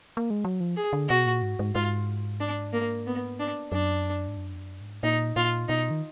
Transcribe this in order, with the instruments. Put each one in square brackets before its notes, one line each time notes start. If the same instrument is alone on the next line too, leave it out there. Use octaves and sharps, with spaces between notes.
[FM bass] A#3
G#3
F#3
F3
[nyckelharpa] G#4
[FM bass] D3
[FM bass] B2 [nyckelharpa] F#4
[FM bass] A#2
G#2
G#2
[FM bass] G#2 [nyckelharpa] F4
[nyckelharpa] D4
A#3
B3
D4
[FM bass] F#2 [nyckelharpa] D4
[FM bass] G#2
F#2
F2
F#2
G#2
[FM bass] A#2 [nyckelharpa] D#4
[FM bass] A#2 [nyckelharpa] F4
[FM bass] B2 [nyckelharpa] D#4
[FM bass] D#3